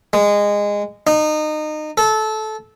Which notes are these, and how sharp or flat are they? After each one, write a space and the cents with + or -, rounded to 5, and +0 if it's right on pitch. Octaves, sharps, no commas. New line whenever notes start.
G#3 -20
D#4 -25
A4 -20